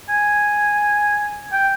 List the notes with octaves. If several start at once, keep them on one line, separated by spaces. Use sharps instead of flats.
G#5
G5